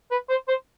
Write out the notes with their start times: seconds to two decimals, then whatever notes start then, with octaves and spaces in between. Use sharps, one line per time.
0.11 B4
0.29 C5
0.48 C5